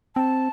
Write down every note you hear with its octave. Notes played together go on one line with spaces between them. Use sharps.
C4 A5